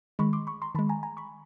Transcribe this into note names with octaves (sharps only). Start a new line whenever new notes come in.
D#3 G#3 B5 C#6
C6 D6
B5 C#6
A#5 C6
D#3 G#3 A5 B5
G#5 A#5
G#5 A#5
B5 C#6